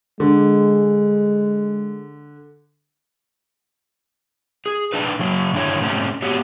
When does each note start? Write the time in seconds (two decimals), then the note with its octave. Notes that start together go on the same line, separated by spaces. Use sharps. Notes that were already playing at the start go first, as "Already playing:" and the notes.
0.20 D3 G#3
4.66 G#4
4.92 D4 D#4 B4
5.19 C#3 F#3
5.54 G2 D3 D#3 E4 F#4 C#5
5.80 G#2 C3 A3 C#4
6.22 B3 F#4 G4 C#5